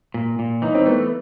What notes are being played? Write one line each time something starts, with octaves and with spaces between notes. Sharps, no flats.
A#2
A#2
E3 D#4
C4
A3 B3